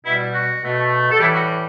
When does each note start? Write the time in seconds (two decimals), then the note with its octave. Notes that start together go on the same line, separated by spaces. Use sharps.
0.05 B2 G3 E4
0.34 F#4
0.62 B2 A3
1.11 A4
1.20 A2 E3 G3 E4 G4
1.34 F#4